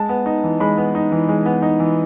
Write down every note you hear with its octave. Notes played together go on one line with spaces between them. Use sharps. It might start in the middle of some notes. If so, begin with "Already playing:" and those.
Already playing: G#3 A5
B3
D#4
E3
G#3 B5
B3
D#4
E3
G#3
B3
D#4
E3